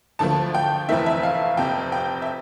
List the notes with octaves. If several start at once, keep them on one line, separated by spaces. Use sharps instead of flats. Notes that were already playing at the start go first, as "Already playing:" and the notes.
D2 D3 F3 A3 A5
G5
F1 F2 E3 A3 C4 E5
E5
F5
F1 F2 C3 G5
G5
E5